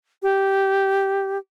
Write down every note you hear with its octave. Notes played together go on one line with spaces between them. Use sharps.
G4